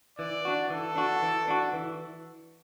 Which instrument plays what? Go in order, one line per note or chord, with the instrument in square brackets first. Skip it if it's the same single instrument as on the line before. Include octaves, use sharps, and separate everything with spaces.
[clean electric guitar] E3 [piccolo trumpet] D5
[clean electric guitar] D4 F#4
[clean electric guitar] E3 [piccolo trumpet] A4
[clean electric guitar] D4 F#4
E3
D4 F#4
E3